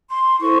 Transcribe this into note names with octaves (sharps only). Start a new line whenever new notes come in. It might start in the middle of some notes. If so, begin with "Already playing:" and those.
C6
E4 A4 C5 C#6